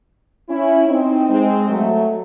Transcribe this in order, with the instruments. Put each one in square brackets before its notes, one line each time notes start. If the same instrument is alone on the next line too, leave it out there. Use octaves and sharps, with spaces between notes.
[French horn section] C#4 E4
C4 D#4
G#3 C4
F#3 A3